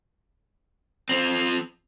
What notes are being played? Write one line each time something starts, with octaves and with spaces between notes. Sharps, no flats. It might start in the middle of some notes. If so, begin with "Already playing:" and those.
F3 C4